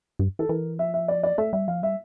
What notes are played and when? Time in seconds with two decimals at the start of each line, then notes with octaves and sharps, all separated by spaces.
0.19 G2
0.39 E3 A4
0.49 E3 A#4
0.79 F3 E5
0.94 E5
1.08 D5
1.23 D5
1.38 A3 E5
1.53 G3 E5
1.68 F3 F5
1.82 G3 E5